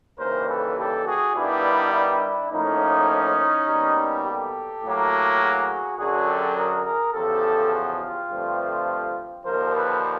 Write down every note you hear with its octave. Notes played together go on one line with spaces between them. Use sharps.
D#2 C#3 E3 G3 A#4 C5
A4 B4
G4 A4
F#4 G#4
G2 D#3 G3 B3 D4 E4
D4 E4
A2 F3 A#3 C#4 D#4
B2 G3 A#3
G4 A4
A2 F#3 A#3
F#4 G#4
F#2 D3 F#3 F#4 G#4
G4 A4
G#4 A#4
G#4 A#4
E2 C#3 F3 G4 A4
F#4 G#4
F4 G4
G2 D3 F3 A3 C4
D#2 D3 F3 A#4 C5
A4 B4